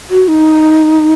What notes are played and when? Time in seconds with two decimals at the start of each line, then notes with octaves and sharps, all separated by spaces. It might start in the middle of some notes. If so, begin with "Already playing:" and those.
0.10 F#4
0.28 D#4